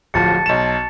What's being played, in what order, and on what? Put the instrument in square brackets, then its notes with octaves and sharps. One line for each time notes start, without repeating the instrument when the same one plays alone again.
[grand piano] D1 F3 [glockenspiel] A5 A6 C#7
[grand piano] B1 E7